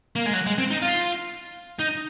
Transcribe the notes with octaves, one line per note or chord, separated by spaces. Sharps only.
A#3
G#3
F#3
G#3
C4
D#4
F4
D#4